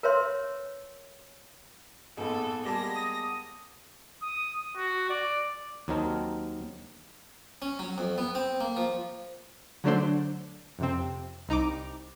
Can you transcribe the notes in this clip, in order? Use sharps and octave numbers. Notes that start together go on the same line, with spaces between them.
A#4 B4 C#5 E5 C6
G#1 F2 A#2 G#3 B3 A4
G3 G#3 A#3 D5 G#5 A5 A#6
D#6
D#6
F#4
D5
D#2 F#3 C4 D#4 A#4 A5
C#4
F#3
F2
B3
C4
A#3
F3
D3 F#3 A3 D4 C5
F2 C3 C4
C2 D#4 A#5 D6